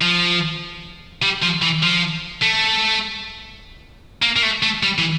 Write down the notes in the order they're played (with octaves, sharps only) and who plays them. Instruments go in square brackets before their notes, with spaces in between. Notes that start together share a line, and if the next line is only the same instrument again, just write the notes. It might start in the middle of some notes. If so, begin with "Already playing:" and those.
[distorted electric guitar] F3
G3
F3
E3
F3
A3
A#3
A#3
A3
A3
G3
E3